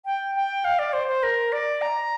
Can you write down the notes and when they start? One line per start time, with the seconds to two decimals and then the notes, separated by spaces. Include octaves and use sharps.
0.05 G5
0.36 G5
0.65 F5
0.79 D5
0.93 C5
1.08 C5
1.23 A#4
1.52 D5
1.82 A#5